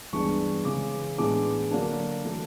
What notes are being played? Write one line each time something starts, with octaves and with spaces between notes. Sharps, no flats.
G2 E3 G#3 B3 D4 C#6
C#3 E3 G#3 D6
A2 E3 G#3 B3 D4 D6
D3 F#3 A#3 D4
E3 A3